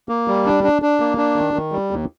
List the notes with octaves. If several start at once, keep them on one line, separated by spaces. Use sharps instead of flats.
A#3
G3
D4
D4
D4
A#3
D4
D#3
D#3
G3
D#2